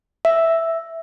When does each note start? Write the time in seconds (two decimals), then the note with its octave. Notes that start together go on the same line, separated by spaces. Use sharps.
0.25 E5